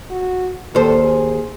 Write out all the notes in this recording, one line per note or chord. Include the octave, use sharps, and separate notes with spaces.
F#4
D#2 A4 C5
G#4